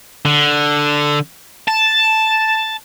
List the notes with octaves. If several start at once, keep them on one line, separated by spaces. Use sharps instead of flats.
D3
A5